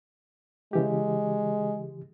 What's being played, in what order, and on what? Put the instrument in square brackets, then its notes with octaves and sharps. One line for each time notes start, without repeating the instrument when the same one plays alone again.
[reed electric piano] C#3 E3 G4 [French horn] G#3